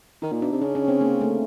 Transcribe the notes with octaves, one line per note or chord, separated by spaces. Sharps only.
D#3 D#4
A#2
B2 D4
C3
C#3 C#4
C#4
C4
A#3
A3